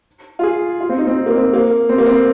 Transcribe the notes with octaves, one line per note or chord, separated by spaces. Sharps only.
F4
G#4
F4
C4
D#4
C4
D#4
A#3
C4
A#3
C4
A#3
C4